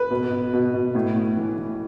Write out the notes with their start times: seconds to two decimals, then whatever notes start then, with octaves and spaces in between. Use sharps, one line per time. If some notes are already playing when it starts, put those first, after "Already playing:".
Already playing: B4
0.11 B2
0.31 B2
0.53 B2
0.74 B2
0.95 A2
1.16 A2
1.37 E3
1.58 E3